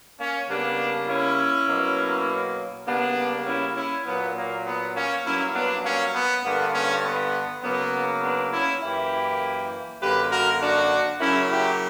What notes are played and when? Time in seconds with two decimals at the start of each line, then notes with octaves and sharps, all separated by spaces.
0.19 A#3 C#4
0.48 C#3 G3 A#3 B3 D4
1.08 C#4 E4
1.67 B2 F#3 A#3
2.86 C#3 G3 A#3 B3 D4
3.46 C#4 E4
3.76 C#4 E4
4.06 A#2 F#3 A#3 B3
4.35 A#3
4.65 B3
4.95 A#3 C#4
5.24 G2 F#3 A#3 C#4 E4
5.54 B3 D4
5.84 A#3 C#4
6.14 B3
6.43 G2 D3 A#3 B3
6.74 A#3 C#4
7.03 B3
7.62 C#3 F#3 A#3 B3
8.22 B3 D4
8.52 C#4 E4
8.82 F#2 E3 A#3 E4 G4
10.00 F#2 D3 A#3 G4 B4
10.30 F#4 A#4
10.60 D4 F#4
11.20 C#3 F#3 A#3 C#4 E4
11.50 E4 G4